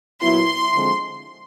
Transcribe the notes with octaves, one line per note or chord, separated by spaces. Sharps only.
A#2 F#3 B3 E4 C6
D3 F3 G#3 C4